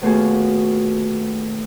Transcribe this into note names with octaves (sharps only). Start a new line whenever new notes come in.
D#2 B2 A3 F4 F#4 G#4